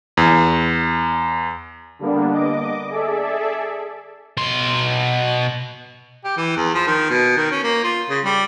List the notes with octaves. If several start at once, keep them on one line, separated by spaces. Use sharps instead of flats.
E2
D3 G3 A#3 B3 D4
D#5 D6
G#4 A4 D5 E5
B2 C6
G4
E3
E2
F3
D#3
B2
D#3
C#4
A#3
F4
C#3
G3